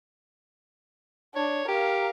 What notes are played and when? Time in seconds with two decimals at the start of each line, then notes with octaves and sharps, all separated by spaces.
1.35 D4 C#5
1.69 G4 A#4 F5